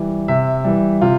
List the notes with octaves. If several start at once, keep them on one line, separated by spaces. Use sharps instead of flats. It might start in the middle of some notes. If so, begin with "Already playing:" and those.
Already playing: E3 G3
C3 E5
E3 G3
C3 F4